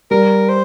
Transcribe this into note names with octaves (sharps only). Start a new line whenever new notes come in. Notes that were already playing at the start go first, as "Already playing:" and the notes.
G3 A#4
C5